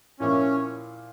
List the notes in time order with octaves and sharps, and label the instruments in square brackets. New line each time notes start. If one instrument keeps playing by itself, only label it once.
[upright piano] A#2 F3 A#3 E4 [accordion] C#4